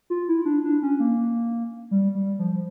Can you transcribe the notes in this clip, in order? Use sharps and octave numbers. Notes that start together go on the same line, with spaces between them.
F4
E4
D4
D4
C#4
A#3
G3
G3
F3